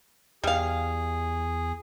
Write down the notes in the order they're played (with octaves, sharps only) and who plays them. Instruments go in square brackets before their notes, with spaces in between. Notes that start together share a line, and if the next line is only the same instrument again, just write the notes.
[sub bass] E2 [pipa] G3 F5 [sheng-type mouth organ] G#4